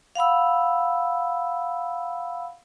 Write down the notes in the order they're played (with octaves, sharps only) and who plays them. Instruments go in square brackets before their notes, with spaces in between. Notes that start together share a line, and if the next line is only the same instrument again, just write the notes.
[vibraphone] F5 F#5 B5 E6